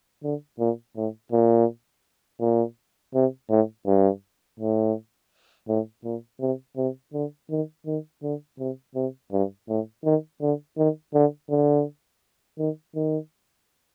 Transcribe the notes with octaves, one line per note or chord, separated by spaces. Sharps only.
D3
A#2
A2
A#2
A#2
C3
A2
G2
A2
A2
A#2
C3
C3
D3
D#3
D#3
D3
C3
C3
G2
A2
D#3
D3
D#3
D3
D3
D#3
D#3